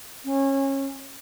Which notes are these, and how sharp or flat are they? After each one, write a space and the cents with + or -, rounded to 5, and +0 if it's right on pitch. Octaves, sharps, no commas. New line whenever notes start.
C#4 -25